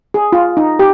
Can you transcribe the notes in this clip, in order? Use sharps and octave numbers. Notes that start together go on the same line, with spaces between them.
G#4
F4
D#4
G4